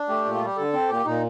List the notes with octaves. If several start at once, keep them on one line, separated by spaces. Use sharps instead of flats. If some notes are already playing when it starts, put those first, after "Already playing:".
Already playing: D4
A3 G4
A#2
F4
G3 G4
D3 A4
C4
A#2 G4
A#2 D#4